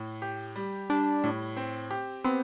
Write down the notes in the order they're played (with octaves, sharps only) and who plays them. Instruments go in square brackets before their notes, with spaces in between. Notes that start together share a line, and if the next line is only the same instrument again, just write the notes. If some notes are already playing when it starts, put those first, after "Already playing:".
Already playing: [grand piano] A2
G4
G3
[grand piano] G3 [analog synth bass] D4
[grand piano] A2
C4
G4
[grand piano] B3 [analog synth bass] C4